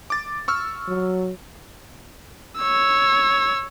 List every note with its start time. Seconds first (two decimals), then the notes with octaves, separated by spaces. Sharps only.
0.10 D6 A6
0.48 C#6 E6 F6
0.88 F#3
2.59 C#5 E6